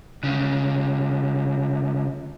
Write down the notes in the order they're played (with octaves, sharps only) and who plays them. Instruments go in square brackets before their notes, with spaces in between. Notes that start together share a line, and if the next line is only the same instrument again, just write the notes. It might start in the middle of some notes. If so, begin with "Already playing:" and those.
[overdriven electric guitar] D2 C#3